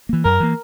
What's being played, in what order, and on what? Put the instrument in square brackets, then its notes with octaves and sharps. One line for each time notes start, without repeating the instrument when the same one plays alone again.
[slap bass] E3 A#3
[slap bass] F#2 [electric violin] A#4
[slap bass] E3 A#3